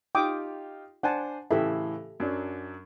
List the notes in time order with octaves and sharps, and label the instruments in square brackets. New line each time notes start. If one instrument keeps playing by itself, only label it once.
[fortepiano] D#4 F4 G4 [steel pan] G5 D6 D#6
[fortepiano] D4 C5 G#5 [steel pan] F#5 A5
[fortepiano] A2 C#3 E3 [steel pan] G4 A4 E5
[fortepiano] F#2 F#3 D4